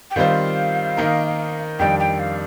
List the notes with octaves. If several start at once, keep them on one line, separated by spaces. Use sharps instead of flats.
G5
D#3 G3 C4 F4 C5 F5
D#3 A#3 D#4 A#4
F2 D#3 G3 D4 G5
G5
F5